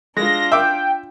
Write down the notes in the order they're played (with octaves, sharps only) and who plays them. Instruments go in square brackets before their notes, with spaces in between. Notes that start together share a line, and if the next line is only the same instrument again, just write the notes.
[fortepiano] G#3 [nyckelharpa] D4 F4 [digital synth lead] A#6
[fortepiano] E5 D6 [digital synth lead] G5